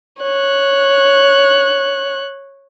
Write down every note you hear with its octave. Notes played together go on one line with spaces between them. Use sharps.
C#5 F#6